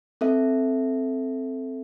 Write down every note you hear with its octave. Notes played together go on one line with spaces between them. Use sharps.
C4 A4 E5